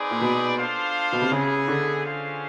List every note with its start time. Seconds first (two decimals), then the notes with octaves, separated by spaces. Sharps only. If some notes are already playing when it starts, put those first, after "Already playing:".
Already playing: C4 D#4 G#4 B4 D5
0.11 A#2
0.21 B2
0.58 D4 F4 A4 C5 F5
1.12 B2
1.22 C3
1.31 C#3 B3 E4 G#4
1.68 D3
2.04 C#4 F4 G#4 C5 F5